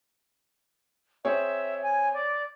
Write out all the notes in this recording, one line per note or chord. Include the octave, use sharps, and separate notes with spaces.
C4 G#4 C#5 E5
G#5
D5